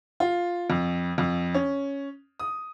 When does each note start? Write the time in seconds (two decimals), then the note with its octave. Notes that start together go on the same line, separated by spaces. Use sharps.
0.20 F4
0.70 F2
1.18 F2
1.54 C#4
2.40 D#6